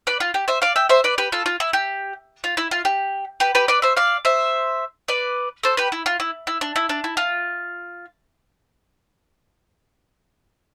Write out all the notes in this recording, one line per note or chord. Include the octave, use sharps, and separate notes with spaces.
B4 D5
F4
G4
C5 E5
D5 F5
E5 G5
C5 E5
B4 D5
G4 B4
F4 A4
F4
E4
G4
F4
E4
F4
G4
G4 B4
G4 B4
B4 D5
C5 E5
D5 F5
C5 E5
B4 D5
A4 C5
G4 B4
E4
F4
E4
E4
D4
E4
D4
E4
F4